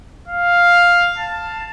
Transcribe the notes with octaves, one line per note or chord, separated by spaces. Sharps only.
F5
A5